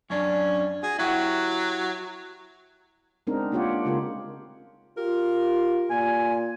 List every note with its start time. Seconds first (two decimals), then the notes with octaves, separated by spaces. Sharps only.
0.10 F#2 C#4 D4
0.83 F#4 G#4
0.99 F#3 E4 F#4 G4
3.27 G#3 B3 C4 D4 D#4 A#4
3.52 A#3 D4 F4 G4 C#5 F#5
3.85 C#3 G#3 F4 G4 A#4
4.97 F4 G4 A#4
5.90 A#2 G#5